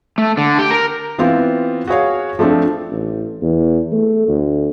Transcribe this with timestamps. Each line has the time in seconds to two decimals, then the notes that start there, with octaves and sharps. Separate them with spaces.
0.18 A3
0.37 D3
0.59 G4
0.71 A#4
1.18 E3 B3 C4 F4
1.87 F#4 G#4 C#5 F5
2.39 F3 A3 C4 D4
2.91 A1
3.42 E2
3.92 A3
4.28 D2